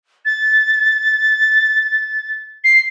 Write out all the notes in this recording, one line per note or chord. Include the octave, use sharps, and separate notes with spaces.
A6
C7